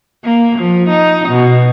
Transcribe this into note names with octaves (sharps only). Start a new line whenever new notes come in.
A#3
F3
D#4
B2